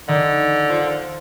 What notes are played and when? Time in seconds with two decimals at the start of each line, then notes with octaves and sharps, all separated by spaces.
0.08 D3 D#3
0.69 F4 C5